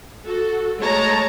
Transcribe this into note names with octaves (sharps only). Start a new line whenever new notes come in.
F#4 A4
G#3 A3 C#5 A5 A#5